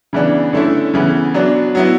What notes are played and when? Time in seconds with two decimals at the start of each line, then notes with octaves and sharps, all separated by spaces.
0.13 C#3 E3 B3 D4
0.53 D3 A3 C#4 E4
0.94 C#3 E3 B3
1.34 F#3 B3 D4
1.75 F#3 B3 E4